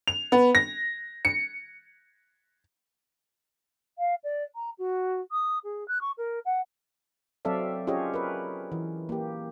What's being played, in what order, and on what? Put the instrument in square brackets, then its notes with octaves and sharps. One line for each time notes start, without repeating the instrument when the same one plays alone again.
[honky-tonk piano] F7
B3
A#6
C#7
[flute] F5
D5
A#5
F#4
D#6
G#4
F#6
C#6
A#4
F#5
[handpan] F#3 C4 A4 D5 E5 F5
C#4 F4 G4 G#4 C#5 D#5
A#4 B4
E3
A#3 G4